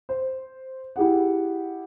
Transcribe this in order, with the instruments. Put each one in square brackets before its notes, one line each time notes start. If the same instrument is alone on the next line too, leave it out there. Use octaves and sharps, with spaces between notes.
[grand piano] C5
E4 G4 G#4 F#5